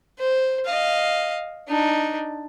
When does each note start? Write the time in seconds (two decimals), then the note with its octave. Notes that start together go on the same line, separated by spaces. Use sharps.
0.19 C5
0.65 D#5 F5
1.68 D4 D#4